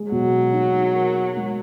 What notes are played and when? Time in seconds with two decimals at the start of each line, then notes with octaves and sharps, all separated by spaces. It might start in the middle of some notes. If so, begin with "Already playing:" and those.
Already playing: G#3
0.11 B2 F#3
0.53 D#4
0.95 A#4
1.36 G#3